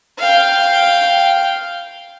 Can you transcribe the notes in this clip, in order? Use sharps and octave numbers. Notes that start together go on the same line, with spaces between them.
F5 G5